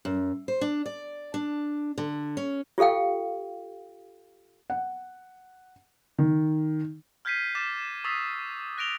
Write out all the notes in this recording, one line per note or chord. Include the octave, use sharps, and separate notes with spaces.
F#2
C5
D4
D5
D4
D3
C#4
F4 G4 A4 F5 G5
F#5
D#3
F6 G6 G#6 B6 C7 D#7
D6 F6 A6 B6 E7
C#6 D#6 E6 A6 B6 C7
F#6 A#6 D7 F7 G7